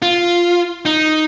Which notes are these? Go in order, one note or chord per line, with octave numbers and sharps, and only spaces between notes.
F4
D#4